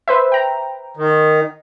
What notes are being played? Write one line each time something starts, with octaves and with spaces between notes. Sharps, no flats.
B4 C5 E5
G5 A#5
D#3